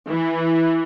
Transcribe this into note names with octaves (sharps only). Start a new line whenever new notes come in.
E3